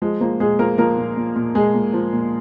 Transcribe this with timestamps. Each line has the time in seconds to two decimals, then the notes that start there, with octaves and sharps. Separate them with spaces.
0.02 F3 G#3
0.21 F3 A#3
0.40 A#2 G#3 G#4
0.59 F3 A#3 A#4
0.78 F3 A#3 A#4
0.97 A#2
1.17 A#2
1.36 A#2
1.55 A#2 G#3 G#4
1.74 A#2
1.93 F3
2.13 A#2